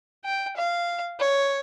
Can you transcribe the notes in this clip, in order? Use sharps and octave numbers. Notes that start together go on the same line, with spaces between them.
G5
F5
C#5